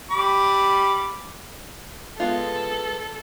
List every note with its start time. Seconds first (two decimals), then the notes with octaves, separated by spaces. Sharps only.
0.11 G3 B5 D6
2.20 G#3 B3 F4 A4